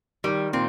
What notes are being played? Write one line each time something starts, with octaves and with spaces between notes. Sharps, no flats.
D#3 G3
A#2 C4